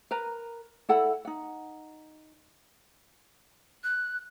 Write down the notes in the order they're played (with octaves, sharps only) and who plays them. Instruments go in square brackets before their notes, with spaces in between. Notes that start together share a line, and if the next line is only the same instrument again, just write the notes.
[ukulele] A#4 B4 A#5
E4 A4 F#5 B5
D#4 F#5
[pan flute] F#6